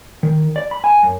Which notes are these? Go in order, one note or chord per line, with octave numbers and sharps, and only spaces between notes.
D#3
D5
B5
G#5
F#2